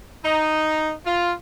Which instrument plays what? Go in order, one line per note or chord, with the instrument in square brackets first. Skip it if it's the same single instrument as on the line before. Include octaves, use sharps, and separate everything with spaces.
[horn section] D#4
F4